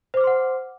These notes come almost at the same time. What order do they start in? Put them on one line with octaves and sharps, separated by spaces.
C5 D6 F6 C6 F#5